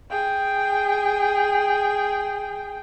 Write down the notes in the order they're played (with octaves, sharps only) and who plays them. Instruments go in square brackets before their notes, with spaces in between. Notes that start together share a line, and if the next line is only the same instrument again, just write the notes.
[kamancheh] G#4 G5